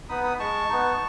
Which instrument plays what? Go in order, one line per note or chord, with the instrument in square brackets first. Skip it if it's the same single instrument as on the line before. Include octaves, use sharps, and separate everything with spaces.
[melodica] B3 D#4 B5 D#6
B5 D#6
G#3 A5 C#6
B3 D#4